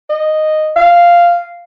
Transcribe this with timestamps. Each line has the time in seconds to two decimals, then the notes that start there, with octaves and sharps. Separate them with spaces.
0.10 D#5
0.76 F5